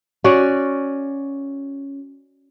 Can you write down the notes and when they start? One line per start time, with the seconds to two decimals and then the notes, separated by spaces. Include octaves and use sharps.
0.24 C#4 F#4 D5